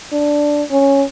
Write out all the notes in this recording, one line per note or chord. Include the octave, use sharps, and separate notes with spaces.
D4
C#4